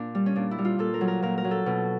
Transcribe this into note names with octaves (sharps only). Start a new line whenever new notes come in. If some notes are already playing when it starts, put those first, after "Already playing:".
Already playing: A#2 D4
G3
C#4
A#2 D4
E4
G3
F4
A#2 A4
A#4
F#3
A#4
A#2 A#4
A#4
F#3
A4
B2